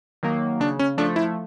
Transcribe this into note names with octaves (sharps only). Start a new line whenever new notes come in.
D#3 F#3 A#3
C#3 D4
C#4
F3 A3 D4
E4